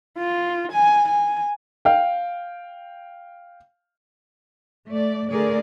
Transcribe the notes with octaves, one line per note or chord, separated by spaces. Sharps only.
F4
G#5
G#5
F5 G5
A3 D5
D3 A3 G#4 A#4 D5